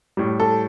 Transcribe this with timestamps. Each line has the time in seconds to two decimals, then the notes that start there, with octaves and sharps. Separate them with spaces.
0.17 A2 G3
0.40 A4